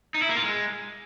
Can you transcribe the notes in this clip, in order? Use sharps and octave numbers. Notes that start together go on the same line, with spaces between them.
D#4
E4
A#3
F4
G#3